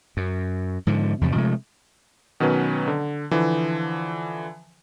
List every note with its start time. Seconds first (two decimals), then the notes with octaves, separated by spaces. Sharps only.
0.17 F#2
0.87 G#2 D3 F3
1.21 E2 G2 C3 F3
1.35 C3 F3 G#3 A3
2.40 B2 D#3 F#3 C#4 B4
2.88 D3
3.31 D3 E3 F3